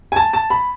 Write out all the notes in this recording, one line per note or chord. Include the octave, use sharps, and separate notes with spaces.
G#5
A5
A5
B5